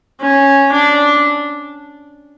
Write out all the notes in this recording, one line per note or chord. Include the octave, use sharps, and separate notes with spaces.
C#4
D4